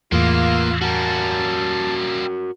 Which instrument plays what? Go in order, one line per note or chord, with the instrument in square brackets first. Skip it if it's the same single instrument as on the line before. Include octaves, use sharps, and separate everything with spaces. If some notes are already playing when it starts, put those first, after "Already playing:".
[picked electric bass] E2 A2 [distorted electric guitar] E3 B3 [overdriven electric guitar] A#3 [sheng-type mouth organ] F4
[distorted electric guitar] G3 A#3 [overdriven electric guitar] F#4 A#4 [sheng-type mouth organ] A5